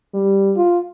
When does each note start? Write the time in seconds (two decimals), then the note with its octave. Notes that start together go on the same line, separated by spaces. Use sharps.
0.14 G3
0.56 F4